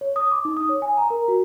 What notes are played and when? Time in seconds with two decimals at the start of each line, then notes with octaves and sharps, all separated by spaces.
0.01 C#5
0.16 D#6
0.31 D6
0.45 D#4
0.57 D#6
0.69 C#5
0.82 G#5
0.97 A#5
1.10 A#4
1.28 F#4